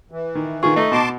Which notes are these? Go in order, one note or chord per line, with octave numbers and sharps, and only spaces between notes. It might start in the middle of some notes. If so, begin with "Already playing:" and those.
E3
D#3
D#3 F4 G#4 C#6
A3 D#4
B2 A5 C6 D6